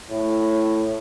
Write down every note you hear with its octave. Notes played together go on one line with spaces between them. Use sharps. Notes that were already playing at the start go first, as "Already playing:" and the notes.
A2